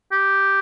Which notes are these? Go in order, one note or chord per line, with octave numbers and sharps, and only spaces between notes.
G4